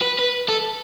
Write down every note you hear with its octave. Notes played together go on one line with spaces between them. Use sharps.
B4
B4
A4